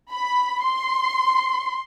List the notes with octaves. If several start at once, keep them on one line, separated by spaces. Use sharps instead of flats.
B5
C6